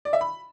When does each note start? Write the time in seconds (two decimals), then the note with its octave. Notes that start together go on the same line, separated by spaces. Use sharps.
0.05 D5
0.13 E5
0.21 B5